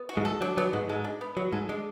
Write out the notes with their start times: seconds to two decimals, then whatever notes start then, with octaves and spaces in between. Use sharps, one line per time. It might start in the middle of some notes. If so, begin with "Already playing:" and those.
Already playing: B3
0.09 F#4
0.17 G#2 G#3
0.25 A4
0.41 F#3 D4
0.57 F#3 B3
0.73 G#2 G#3 F#4
0.89 G#2 G#3 A4
1.04 D4
1.21 B3
1.37 F#3 F#4
1.52 G#2 G#3 A4
1.69 G#3 D4